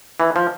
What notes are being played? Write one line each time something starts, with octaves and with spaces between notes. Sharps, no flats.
E3
F3